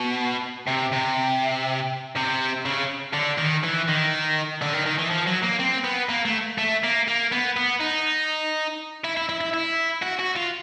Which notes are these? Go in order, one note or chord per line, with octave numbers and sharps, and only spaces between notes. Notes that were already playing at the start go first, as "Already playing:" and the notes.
Already playing: B2
C3
C3
C3
C#3
D3
D#3
E3
D#3
D3
D#3
D#3
E3
F3
F#3
A#3
C4
B3
A#3
A3
A3
A#3
A#3
B3
B3
D#4
E4
E4
E4
E4
E4
F#4
F#4
F4